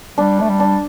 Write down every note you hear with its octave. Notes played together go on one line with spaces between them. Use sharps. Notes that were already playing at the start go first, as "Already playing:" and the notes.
G3 D4
A3 D4
G3
D4